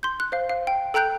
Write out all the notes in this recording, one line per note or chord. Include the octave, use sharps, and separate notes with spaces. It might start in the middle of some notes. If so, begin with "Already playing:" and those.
C6 G6
F#6
C5 F5
F5
G5
A4 G5 A#5 F#6 G6 D7